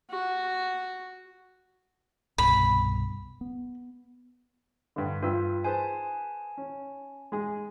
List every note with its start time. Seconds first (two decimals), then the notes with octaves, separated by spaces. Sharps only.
0.10 F#4
2.38 C2 G2 B2 B5
3.41 B3
4.96 G2 D3
5.23 G2 F4 B4 E6
5.64 G#4 B4 C5 G#5 A5
6.57 C#4
7.32 G#3 G#4